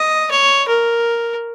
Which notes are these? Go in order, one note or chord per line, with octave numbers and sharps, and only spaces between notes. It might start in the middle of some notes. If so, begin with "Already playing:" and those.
Already playing: D#5
C#5
A#4